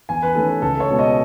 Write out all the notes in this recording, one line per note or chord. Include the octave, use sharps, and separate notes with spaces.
E2 G#5
B4
D#3 A3 C#4 A4
B4
C#2 A4
C#5
B2 G#3
D#5